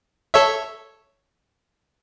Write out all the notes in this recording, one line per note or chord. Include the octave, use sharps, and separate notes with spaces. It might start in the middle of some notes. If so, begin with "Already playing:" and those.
A4 C#5 E5